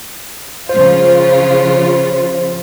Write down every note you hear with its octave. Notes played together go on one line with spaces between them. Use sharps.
C#3 F3 F4 C5